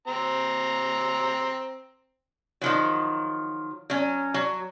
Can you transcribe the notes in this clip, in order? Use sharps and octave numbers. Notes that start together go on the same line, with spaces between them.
C4 A#5
D#3 F3 F#3
F#3 C#4
F#3